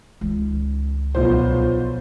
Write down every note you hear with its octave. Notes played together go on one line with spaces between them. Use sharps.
C#2 D#3
B1 F3 C5